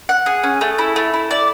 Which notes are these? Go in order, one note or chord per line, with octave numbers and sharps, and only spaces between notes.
F#5
G#4
C#4
A3
E4
A3
E4
D5